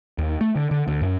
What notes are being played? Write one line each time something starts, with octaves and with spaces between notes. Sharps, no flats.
D#2
A3
D3
D3
D2
F#2